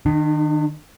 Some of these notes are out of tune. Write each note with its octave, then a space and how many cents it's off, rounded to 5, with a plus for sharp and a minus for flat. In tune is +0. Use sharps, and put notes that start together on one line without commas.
D#3 -15 D4 +40